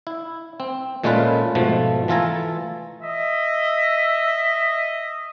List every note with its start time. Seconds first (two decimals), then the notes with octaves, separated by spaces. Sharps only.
0.07 E4
0.60 C4
1.04 A#2 G#3 A3 C#4 F4 B4
1.55 G#2 B2 F3 A3
2.08 E3 A3 F4 A4 G#5 A#5
3.02 D#5 E5